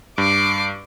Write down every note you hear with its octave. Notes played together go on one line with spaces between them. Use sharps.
G2 D6 C7